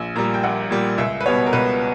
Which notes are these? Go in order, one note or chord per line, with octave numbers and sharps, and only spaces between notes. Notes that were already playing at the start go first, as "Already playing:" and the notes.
Already playing: A#1
A#2 G3 A#5
G5
A#1 F#5
A#2 G3
C#2 E5
B4
B2 G3 B3 C#5
A#4
C#2 B4